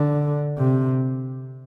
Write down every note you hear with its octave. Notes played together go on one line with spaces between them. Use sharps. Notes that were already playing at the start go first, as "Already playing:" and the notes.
Already playing: D3
C3